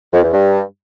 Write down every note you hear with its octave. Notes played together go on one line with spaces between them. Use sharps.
F2
E2
G2